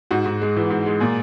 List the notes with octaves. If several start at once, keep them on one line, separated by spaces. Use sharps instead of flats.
G#2 F#4
G#2
G#3
E3
G#2
G#3
A#2 G#4